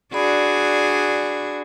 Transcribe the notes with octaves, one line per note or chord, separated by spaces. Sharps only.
D4 F#4 G#4 D5 B5